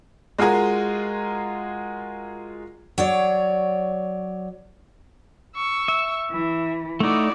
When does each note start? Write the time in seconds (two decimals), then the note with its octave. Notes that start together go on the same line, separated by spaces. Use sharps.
0.39 G#3 F4 F#4 G#4 A#4
2.98 F#3 C#5 D5
5.56 C#6 E6
5.88 E5
6.31 E3
7.00 A3 D#4 E4 F#4 D5